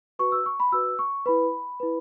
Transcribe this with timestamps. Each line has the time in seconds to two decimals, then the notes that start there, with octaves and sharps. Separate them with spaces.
0.19 F#4 B4 C#6
0.32 E6
0.46 C#6
0.60 B5
0.72 F#4 B4 E6
0.99 C#6
1.26 E4 B4 B5
1.80 E4 B4